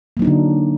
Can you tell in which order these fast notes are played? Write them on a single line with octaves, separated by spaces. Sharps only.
A#3 F#3 D#4 D4 D3